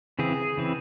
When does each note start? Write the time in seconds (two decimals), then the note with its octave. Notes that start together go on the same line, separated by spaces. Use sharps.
0.19 C#3 E3 C4 G#4
0.57 C#3 E3 C4